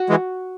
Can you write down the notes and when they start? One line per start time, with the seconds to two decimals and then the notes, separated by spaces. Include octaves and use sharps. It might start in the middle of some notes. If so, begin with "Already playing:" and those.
Already playing: F#4
0.09 E3 G#3